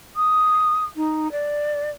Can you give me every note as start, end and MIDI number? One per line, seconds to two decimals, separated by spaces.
0.16 0.83 87
0.96 1.30 63
1.31 1.90 74